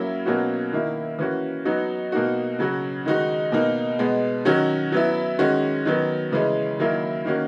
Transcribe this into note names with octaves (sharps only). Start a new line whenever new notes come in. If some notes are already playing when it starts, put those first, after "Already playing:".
Already playing: F#3 A#3 C#4 E4
B2 F#3 A#3 C#4 F#4
D#3 A#3 E4
E3 A#3 C#4 F#4
F#3 B3 D#4 F#4
B2 A#3 D#4 F#4
C#3 F#3 C#4 F#4
D#3 G#3 D#4 F#4
B2 A#3 D#4
B2 G#3 B3
D#3 F#3 C#4 F#4
F#3 B3 E4
D#3 G#3 C#4 F#4
D#3 F#3 B3
C#3 E3 G#3 C#4
D#3 F#3 A#3 E4
D#3 A#3 C#4 F#4